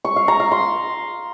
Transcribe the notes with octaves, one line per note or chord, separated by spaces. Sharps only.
C#6
F5
A#5
F5
C6